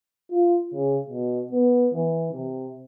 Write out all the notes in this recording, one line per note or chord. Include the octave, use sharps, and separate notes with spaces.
F4
C#3
B2
B3
E3
C3